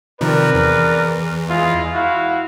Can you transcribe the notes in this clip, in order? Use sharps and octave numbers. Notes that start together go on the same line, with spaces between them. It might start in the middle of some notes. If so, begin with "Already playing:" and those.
C3 D#3 F3 A#4 B4 D5
E2
G#3 E4 F4
E4 F#4 F5